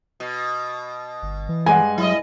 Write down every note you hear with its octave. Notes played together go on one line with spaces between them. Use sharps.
B2
G1
E3
G2 G#3 F#5 G#5
F#3 E4 D#5